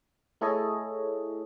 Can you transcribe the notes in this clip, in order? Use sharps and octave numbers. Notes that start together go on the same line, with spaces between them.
A3 E4 G#4 A4 C#5 D#5